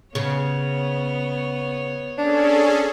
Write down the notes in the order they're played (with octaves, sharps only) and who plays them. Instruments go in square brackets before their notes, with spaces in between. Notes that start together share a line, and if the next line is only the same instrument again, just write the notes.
[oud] C#3 [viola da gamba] B3 C#5
[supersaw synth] C#4 G#4 A4 [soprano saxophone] D4